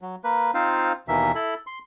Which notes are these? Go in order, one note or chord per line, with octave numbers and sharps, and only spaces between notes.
F#3
A#3 B4
C4 D#4 F4 C5 F5
D#2 B2 E3 A#3 E5
E4 A4 B5
C6